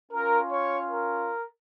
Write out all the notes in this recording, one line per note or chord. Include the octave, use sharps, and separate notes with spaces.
C#4 F4 A#4
C#5
A#4